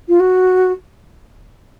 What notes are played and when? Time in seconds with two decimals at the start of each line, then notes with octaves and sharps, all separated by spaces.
0.08 F4
0.20 F#4